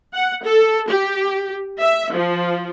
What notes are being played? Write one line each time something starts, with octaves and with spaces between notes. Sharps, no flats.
F#5
A4
G4
E5
F3